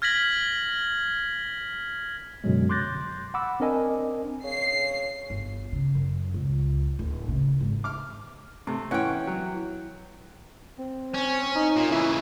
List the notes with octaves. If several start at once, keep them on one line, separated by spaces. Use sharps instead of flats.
F6 G#6 A#6 B6 F#7
F#2 B2 D3 F#3 G#3
C6 D6 F#6 G6 A6 A#6
F#5 B5 D6 E6
C4 D4 A#4 D#5 G#5
C#3 C7
G1
C#3
F#2
C#2
D1
C#3
G#1
D6 F6
C3 A3
E3 C#4 F#5 G5 F#6
F#3
C4
C#4
D#4
A#2
C#3 E3 E4